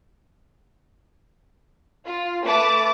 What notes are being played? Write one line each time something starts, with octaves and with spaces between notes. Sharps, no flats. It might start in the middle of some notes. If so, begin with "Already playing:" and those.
F4
A3 B4 A5 D6 A6